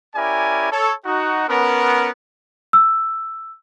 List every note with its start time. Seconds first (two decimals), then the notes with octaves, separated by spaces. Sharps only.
0.15 C#4 E4 G4 A#4 D5 G#5
0.71 A4 C#5
1.05 D#4 F#4
1.48 B3 C#4 A#4
2.73 E6